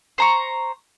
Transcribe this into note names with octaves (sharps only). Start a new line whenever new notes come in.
C5 A#5 C#6